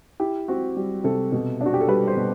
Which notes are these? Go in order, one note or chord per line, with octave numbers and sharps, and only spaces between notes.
E4 G4
C4 F#4
G3
C3 A4
B2
D4
F#4
G4
A4
G3 B4
C5
B2